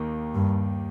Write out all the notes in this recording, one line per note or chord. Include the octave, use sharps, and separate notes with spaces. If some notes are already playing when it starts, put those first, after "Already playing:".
Already playing: D#2 D#3 A#3
G2